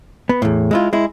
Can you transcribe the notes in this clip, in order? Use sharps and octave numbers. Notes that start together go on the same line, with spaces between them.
B3
E2 A2
G#3 E4 F4
G#3 E4